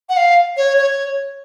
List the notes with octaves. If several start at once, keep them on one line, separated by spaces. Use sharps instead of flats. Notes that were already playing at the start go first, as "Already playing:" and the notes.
F#5
F5
C#5
C#5